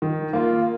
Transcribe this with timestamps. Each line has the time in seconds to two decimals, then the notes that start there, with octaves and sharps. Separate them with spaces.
0.02 D#3
0.33 A#3 F4